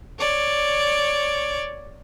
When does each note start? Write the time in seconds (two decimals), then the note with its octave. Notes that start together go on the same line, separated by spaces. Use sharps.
0.19 C#5 D5